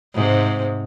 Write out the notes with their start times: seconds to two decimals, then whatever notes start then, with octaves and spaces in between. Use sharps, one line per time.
0.14 G#2 C3